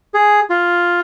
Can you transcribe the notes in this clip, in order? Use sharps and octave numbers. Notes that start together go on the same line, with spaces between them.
G#4
F4